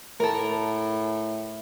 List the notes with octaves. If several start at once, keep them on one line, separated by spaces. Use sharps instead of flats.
A2 A4 A#4